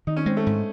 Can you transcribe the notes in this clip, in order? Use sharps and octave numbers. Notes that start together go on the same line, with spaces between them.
D#3 D#4
C#4
G#3 C4
A3
G#2